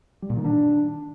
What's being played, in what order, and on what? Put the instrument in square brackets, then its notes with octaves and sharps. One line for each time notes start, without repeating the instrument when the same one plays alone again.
[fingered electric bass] G3
A#2
D#3
D4